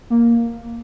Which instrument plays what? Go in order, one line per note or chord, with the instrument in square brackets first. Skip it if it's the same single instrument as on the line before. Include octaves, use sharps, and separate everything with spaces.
[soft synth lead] A#3